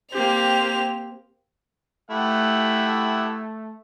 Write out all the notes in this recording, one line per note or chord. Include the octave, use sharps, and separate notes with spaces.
A#3 C4 G4 F7
A3 E4 G4 F#5